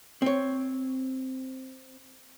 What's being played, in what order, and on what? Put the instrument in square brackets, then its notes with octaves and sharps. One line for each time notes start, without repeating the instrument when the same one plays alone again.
[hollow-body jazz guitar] C4 C#5